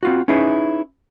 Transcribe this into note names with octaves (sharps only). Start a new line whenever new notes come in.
C4 F4 F#4
C#4 D#4 E4 G#4 B4